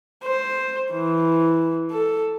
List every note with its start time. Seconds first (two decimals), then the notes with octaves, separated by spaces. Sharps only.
0.24 C5
0.93 E3
1.91 A4